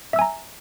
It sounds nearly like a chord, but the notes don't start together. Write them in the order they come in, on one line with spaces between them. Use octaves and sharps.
E5 E6 G#5 A#5